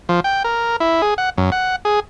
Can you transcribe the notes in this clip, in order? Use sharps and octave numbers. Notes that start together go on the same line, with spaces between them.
F3
G5
A#4
E4
G#4
F#5
F#2
F#5
G#4